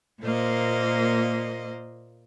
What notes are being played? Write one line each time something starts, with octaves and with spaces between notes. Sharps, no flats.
A#2 A#3 C5 D#5